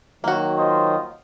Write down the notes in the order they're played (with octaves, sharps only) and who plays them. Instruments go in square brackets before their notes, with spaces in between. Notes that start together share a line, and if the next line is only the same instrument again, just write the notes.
[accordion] D#3 F#3 [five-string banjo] A#3 F#4
[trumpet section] F4 C5 D#5